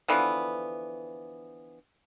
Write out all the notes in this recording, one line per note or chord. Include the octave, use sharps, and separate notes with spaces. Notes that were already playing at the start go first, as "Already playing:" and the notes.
D3 E3 F3 B3